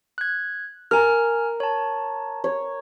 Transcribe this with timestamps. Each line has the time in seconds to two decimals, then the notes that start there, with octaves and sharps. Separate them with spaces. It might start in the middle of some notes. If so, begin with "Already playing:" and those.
0.18 F#6 G#6
0.91 A#4 G#5 F6
1.60 C#5 A5
2.44 C#5